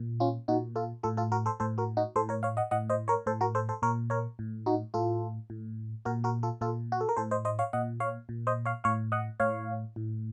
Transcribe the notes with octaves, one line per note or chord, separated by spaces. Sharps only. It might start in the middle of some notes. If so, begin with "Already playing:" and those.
Already playing: A#2
C#4 F4
A#2 D#4 F#4
F4 A4
A2 F4 A4
F4 A4
F#4 A#4
A4 C5
A2 A4 C5
F#4 A#4
D#4 F#4
A2 A4 C5
A#4 C#5
C#5 F5
D#5 F#5
A2 D#5 F#5
C5 D#5
A#4 C#5
A2 A4 C5
F#4 A#4
A4 C5
A4 C5
A#2 A#4 C#5
A#4 C#5
A2
D#4 F#4
A2 F4 A4
A2
A#2 F#4 A#4
F#4 A#4
F4 A4
A#2 F4 A4
F#4
A4
A#4
A2 A4 C5
C5 D#5
C5 D#5
C#5 F5
A#2 D#5 F#5
C#5 F5
A#2
C5 D#5
C#5 F5
A2 C#5 F5
D#5 F#5
A2 C#5 F5
A2